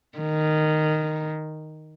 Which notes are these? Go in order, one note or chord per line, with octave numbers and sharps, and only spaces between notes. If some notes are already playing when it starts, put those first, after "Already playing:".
D#3